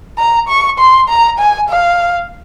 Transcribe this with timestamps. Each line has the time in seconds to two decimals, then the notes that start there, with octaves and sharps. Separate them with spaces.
0.18 A#5
0.49 C#6
0.79 C6
1.09 A#5
1.39 G#5
1.69 F5